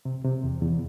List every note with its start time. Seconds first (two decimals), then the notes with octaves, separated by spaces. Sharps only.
0.05 C3
0.24 C3
0.44 E2
0.62 E2